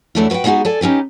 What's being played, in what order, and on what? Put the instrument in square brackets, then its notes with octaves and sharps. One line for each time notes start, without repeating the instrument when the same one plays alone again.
[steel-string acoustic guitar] E2 E3 F#3 A3 D4 E4
F#4 B4 D#5 F#5 G5
G#3 B3 D#4 F4 F#4 G#4
A4 D5 G#5
C#4 D#4 G4 B4